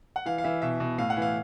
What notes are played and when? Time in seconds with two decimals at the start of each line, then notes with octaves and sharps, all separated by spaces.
0.16 F#5
0.26 E3 F5
0.38 F5
0.44 E3 E5
0.62 B2 E5
0.80 B2
0.98 A2 F5
1.10 F#5
1.17 E3 F5